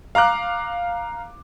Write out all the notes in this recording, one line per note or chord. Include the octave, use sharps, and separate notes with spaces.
F5 A#5 D6 F#6